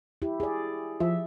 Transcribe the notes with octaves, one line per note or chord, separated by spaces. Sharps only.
E4 G4
G#4 D5
F3 E5